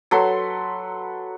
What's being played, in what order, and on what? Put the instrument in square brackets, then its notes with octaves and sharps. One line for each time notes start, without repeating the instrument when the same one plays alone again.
[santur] F#3 A4 B4 C6